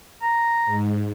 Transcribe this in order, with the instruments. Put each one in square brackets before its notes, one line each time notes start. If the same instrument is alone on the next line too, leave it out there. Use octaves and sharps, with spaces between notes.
[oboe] A#5
[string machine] G#2